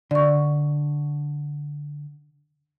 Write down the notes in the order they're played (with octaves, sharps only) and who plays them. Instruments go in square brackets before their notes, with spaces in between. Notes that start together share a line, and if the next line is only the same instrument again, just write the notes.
[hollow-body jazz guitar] D3 [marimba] D5 C#6